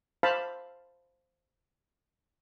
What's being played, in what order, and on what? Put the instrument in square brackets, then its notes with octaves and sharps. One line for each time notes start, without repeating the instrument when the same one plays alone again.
[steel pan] C5 F5 A5 B5